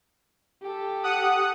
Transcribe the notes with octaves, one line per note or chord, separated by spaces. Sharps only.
G4 A4
F#5 D#6